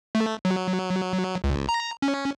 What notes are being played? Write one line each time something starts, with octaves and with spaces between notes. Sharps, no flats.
A3
F#3
C#2
A#5
C#4